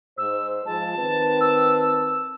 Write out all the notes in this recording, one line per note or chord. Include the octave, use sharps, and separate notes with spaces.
G#2 C5 E6
F3 G#3 A5
D#3 C4 B4
E6